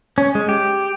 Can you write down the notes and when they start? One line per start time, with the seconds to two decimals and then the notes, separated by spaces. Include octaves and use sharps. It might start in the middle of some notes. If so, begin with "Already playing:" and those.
0.18 C#4
0.35 G#3
0.49 G4